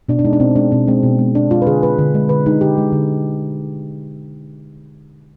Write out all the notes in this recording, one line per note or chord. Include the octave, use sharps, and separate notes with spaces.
B2 D4
D4
G#3 D#4
D4
B2 C4
G#3 D4
B2 C4
G#3 C4
B2
G#3
B2 D4
G#3 F4
B4
D3 G#4
G#3 B4
D3
G#3
D3 B4
G#3 D#4
D3 G4
G#3
D3